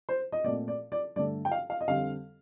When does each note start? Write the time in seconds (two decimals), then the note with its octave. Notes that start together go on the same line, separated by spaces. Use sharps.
0.09 C5
0.32 D#5
0.44 A#2 A3 C4 D5
0.68 D5
0.92 D5
1.16 G2 D3 A3 D5
1.45 G5
1.52 F5
1.70 F5
1.81 D#5
1.87 F2 D3 G3 C4 F5